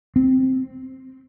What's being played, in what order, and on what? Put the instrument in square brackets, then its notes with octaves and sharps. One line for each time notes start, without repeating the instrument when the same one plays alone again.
[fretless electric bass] C4